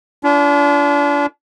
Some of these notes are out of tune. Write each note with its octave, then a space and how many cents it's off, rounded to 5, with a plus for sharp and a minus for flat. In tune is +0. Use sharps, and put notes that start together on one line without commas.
D4 -35 F4 -40